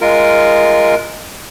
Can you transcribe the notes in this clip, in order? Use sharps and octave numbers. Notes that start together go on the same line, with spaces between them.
G#3 F4 A#4